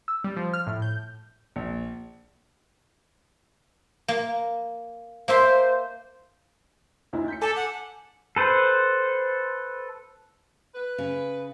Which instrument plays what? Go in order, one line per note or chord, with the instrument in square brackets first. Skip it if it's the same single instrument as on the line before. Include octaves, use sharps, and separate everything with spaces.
[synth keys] E6
G3
F3
F6
A2
G6
[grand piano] A#1
[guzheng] A#3
[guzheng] A#3 E5 C6 [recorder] C5
[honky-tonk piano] D2 D#4 E4
G6 B6 C#7
[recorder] A4 [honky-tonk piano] G#5 D6
[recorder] F#5
[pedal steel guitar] A4 B4 C5
[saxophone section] B4
[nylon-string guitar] C#3